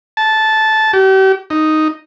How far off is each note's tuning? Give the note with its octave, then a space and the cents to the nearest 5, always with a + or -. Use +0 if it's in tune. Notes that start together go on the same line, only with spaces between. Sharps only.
A5 -10
G4 -40
D#4 +0